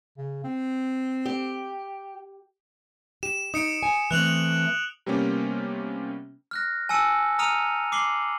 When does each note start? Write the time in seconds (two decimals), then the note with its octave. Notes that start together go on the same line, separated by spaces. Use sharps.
0.18 C#3
0.44 C4
1.25 G4
3.23 G4 E7
3.54 D#4 D#6 C#7 D7
3.83 G#5
4.11 E3 A3 C4 F#6 F7 F#7
5.06 C3 G3 A#3 B3 C#4 G4
6.51 F6 F#6 A#6
6.89 G#5 A5 E6 C#7
7.39 A#5 D#6 F6 C#7 D#7 F7
7.92 D6 C7 F#7 G7